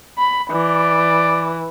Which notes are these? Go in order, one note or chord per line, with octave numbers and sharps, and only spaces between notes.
B5
E3 D5